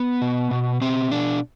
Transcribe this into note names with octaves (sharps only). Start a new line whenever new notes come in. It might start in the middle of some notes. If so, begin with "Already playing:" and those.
Already playing: B3
B2
B2
B2 C4
B2 D4